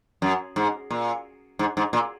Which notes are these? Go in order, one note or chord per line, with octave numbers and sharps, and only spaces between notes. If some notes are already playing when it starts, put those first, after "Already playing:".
F#2
G#2
A#2
G#2
G#2
A#2